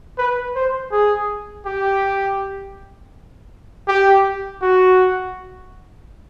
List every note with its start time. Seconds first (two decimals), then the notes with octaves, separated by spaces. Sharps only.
0.18 B4
0.55 C5
0.92 G#4
1.66 G4
3.88 G4
4.62 F#4